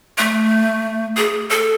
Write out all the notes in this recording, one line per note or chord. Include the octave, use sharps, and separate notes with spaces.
A3
G#4
A4